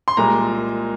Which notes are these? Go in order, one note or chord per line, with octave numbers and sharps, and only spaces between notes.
C6
C2 A#2 G#3 A#5